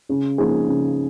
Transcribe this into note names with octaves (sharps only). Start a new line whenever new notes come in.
C#3
F3 A#3 D#4 G#4
C#3